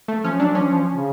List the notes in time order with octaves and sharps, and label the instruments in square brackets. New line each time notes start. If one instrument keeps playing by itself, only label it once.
[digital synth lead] A3
[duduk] F3 [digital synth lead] C#4
[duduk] F#3 [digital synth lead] D4
[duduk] F3 [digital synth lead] C#4
[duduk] F3
C#3